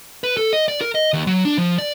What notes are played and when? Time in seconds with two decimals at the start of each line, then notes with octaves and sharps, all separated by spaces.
0.24 B4
0.37 A4
0.53 D#5
0.68 D5
0.81 A#4
0.95 D#5
1.13 D#2
1.27 F#3
1.45 D4
1.58 F3
1.78 D5